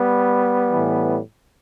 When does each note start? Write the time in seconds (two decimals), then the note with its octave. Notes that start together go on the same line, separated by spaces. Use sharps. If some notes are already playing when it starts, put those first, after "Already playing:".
Already playing: G3 B3
0.72 A2 E3